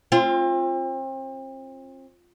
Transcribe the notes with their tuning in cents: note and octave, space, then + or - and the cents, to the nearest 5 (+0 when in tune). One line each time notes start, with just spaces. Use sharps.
C4 +35 F4 -5